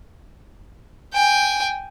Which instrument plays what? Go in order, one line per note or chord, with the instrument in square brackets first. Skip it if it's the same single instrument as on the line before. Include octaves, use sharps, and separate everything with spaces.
[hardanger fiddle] G5 G#5